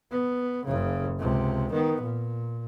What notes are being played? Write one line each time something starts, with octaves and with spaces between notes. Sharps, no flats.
B3
F#1 C#3
C#2 C3
D#3 B3
A#2